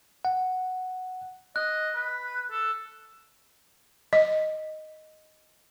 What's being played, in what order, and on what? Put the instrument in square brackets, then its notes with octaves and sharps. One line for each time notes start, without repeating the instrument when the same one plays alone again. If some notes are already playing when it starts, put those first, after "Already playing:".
[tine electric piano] F#5
[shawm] D#5 [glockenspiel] F#6
[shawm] B4
A4
[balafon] D#5